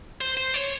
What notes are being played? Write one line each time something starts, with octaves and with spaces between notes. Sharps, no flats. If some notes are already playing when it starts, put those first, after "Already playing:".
C5
C5
C#5